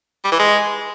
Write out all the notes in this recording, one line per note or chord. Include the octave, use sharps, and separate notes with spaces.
G3
E3
G#3